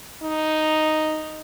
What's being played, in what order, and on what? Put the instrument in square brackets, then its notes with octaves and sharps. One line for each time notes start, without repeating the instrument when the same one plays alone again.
[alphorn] D#4